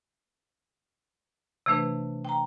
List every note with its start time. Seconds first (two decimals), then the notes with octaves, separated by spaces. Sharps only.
1.66 C3 E3 A3 D4 B4
2.25 G5 A#5